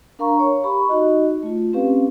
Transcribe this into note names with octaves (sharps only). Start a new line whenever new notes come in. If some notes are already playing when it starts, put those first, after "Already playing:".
D4 A#4 F5 A#5 C#6
C#5
G4 B5 C#6
D#4 F#4 D#5
A3 F4
C4 C#4 G4 B4 F5